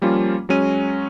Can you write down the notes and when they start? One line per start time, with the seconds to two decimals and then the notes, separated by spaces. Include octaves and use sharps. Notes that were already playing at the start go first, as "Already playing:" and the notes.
0.02 F3 G3 A#3 C#4 F4
0.49 F#3 G#3 C#4 D#7